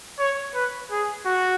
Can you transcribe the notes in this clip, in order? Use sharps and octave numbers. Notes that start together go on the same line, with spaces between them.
C#5
B4
G#4
F#4